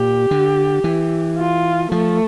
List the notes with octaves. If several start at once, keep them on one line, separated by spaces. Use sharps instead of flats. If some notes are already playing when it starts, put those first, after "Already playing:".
Already playing: A#2 G4
D3
E3
F4
F3 A3